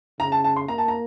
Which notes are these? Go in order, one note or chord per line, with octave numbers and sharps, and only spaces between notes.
C#3 A#5
A5
A5
C6
A#3 A#5
A5
A#5